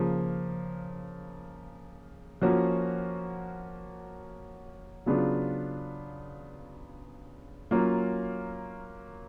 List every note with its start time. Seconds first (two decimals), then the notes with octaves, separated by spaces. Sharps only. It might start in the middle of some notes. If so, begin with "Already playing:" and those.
Already playing: C#3 F3 A#3
2.42 F3 A#3 C#4 F#4
5.06 C#3 F#3 B3 D4 F4
7.71 F#3 A#3 C#4 F4